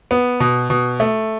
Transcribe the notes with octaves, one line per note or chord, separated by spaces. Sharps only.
B3
B2
B2
A3